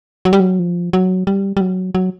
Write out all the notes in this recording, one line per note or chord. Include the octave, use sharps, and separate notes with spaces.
F#3
G3
F#3
F3
F#3
G3
G3
F#3
F#3